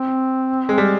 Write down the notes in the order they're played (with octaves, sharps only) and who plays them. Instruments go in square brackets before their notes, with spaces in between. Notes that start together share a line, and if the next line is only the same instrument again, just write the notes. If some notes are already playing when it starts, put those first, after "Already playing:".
Already playing: [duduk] C4
[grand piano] G#3
G3